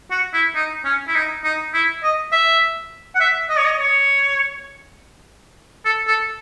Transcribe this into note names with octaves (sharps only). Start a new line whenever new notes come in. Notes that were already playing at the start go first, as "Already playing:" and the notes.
F#4
E4
D#4
C#4
E4
D#4
D#4
E4
D#5
E5
F#5
E5
D#5
C#5
D#5
C#5
A4
A4